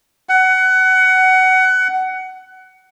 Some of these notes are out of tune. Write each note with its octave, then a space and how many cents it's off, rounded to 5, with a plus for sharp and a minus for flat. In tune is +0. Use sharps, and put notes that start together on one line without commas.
F#5 +20